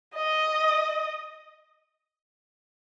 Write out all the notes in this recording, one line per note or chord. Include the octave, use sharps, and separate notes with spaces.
D#5